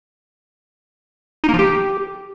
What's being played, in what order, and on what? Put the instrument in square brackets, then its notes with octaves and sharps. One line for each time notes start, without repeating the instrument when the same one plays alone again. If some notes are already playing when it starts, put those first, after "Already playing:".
[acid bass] D#4
A#3
F3
G4